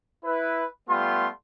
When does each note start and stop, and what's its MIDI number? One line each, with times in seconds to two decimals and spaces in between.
0.25 0.64 64
0.25 0.64 71
0.89 1.27 55
0.89 1.27 57
0.89 1.27 59
0.89 1.27 65
0.89 1.27 84